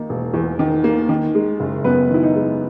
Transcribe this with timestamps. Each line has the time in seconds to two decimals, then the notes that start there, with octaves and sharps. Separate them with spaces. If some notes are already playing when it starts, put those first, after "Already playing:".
Already playing: D#3 A#3 D#4
0.09 E1
0.34 E2
0.59 D#3
0.84 A#3
1.09 D#3
1.35 G#3
1.60 F#1
1.84 F#2 B3 B4
2.10 D#3 E4
2.23 D#4
2.35 G#3